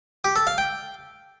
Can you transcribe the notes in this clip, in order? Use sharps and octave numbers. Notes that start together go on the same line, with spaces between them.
G4
A4
F5
G5